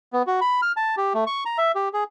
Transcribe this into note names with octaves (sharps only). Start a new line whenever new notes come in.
B3
F#4
B5
F6
A5
G4
A3
C#6
A#5
E5
G4
G#4